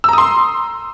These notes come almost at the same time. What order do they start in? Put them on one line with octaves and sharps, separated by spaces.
E6 A#5 D#6 C6